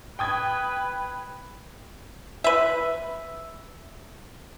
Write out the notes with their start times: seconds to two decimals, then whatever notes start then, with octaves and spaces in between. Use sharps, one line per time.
0.19 B4 G5 D#6 G#6
2.44 B4 E5